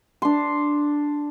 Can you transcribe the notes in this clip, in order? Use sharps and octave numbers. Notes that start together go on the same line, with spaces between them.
D4 C6